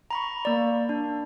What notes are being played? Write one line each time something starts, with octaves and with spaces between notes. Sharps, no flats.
A#5 B5 C#6
A#3 D5
D4